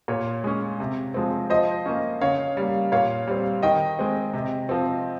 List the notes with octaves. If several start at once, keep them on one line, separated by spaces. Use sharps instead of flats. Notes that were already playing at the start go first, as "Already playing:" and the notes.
A#2 C#5
G#3 C#4
C3
F3 G#3 C4
F3 C5 D#5
A#3 C#4
C#3 C#5 F5
G3 A#3
A#2 C#5 F5
G3 C4
D#3 D#5 G5
G#3 C4
C3
F3 C4